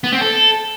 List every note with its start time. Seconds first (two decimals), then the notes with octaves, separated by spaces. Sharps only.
0.04 B3
0.12 C4
0.21 A4